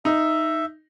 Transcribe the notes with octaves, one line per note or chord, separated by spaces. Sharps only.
D#4 E5